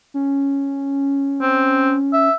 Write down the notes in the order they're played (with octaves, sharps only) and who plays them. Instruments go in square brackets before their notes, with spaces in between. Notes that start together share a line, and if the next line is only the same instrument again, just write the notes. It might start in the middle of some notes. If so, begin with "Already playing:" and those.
[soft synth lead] C#4
[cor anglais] C4
E5